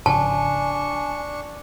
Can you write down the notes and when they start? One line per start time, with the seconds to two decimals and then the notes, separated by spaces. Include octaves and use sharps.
0.06 G#1 C#3 F3 D4 G#5 A5 C#6